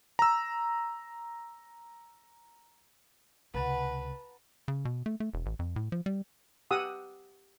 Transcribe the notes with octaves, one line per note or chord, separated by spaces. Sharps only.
A#5 E6
C#2 C3 B4 F#5 A5 A#5
C#3
B2
A3
A3
E1
A1
F2
A2
F3
G3
G4 F#5 D#6 E6